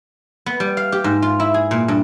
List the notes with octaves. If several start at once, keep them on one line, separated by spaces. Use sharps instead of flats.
B3
G3
F5
G4
G#2
F4
E4
G#4
A#2
G2